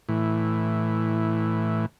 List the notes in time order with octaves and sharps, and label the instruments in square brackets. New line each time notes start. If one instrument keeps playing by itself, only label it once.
[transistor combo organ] A2 E3